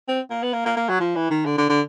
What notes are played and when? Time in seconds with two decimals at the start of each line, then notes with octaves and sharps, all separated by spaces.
0.08 C4
0.30 A#3
0.43 B3
0.53 A#3
0.66 A#3
0.77 A#3
0.89 F#3
1.00 F3
1.16 E3
1.31 D#3
1.46 D3
1.58 D3
1.69 D3